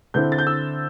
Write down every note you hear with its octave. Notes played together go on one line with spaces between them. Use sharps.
D3 C4 E4 G6
A6
G6
E6